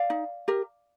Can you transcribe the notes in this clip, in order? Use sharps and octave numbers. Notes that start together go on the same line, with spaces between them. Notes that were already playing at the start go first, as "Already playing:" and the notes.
Already playing: D5 F5
D#4
G4 A#4